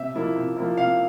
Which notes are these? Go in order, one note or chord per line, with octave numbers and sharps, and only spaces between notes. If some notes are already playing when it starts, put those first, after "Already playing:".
Already playing: C3 E5
F3 A#3 E4
C3
F3 A#3 E4
C3 F5